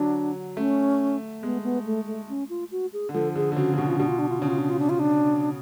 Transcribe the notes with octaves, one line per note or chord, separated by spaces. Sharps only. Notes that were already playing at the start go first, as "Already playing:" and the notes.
Already playing: D3 F#3 D4
A3 C#4
G#3 B3
B3
A3
A3
C#4
F4
F#4
G#4
D3
F3 A4
D3 G#4
D3
C#3 F#4
C#3
B2 D4
F4
B2 D4
F4
D4
F4
C#3 D4
F4
D4
F4
D4
F4
D4